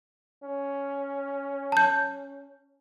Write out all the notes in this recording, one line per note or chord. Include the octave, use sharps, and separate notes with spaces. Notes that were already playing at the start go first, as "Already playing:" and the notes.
C#4
A5 G6